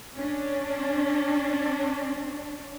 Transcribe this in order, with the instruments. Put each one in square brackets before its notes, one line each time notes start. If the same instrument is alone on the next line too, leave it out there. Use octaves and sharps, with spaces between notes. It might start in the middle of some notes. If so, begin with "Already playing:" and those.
[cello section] C#4 D4